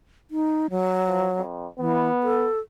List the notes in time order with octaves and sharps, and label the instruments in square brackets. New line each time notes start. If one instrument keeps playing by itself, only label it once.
[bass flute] D#4
F#3
[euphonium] F3
F2
[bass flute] E3 [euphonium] B3
[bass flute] A4